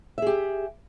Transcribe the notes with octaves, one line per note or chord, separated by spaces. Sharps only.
G4 G#4 E5